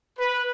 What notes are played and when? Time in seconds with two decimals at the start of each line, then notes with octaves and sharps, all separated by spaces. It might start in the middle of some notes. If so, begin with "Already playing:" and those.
0.18 B4